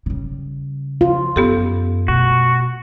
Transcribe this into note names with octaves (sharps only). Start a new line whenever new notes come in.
C#3 G3
F4
F#2 B3 G4 A4
B2 A3 F#4